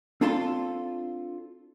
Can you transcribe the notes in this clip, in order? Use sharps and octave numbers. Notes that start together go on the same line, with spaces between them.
C4 D4 F4 A4 A5 C6